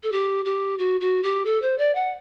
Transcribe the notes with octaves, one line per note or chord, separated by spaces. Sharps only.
A4
G4
G4
F#4
F#4
G4
A4
C5
D5
F#5